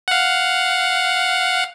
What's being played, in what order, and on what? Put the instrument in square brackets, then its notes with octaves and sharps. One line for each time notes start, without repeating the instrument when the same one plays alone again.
[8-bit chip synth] F5 F#5